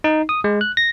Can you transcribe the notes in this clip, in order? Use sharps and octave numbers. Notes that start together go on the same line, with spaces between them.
D#4
D#6
G#3
F#6
A#6